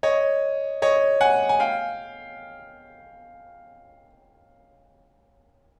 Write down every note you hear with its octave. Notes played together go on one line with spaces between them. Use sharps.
C#5 D#5
C#5 D#5
F#5 G#5
G#5
F5 G5